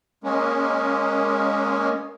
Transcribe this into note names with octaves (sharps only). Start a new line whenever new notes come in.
G#3 A#3 C#4